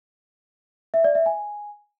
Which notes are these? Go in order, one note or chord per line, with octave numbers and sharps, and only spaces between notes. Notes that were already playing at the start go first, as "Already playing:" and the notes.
E5
D5
E5
G#5